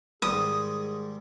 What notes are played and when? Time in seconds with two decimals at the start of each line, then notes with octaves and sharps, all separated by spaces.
0.22 G#2 D#3 G3 G#4 D#6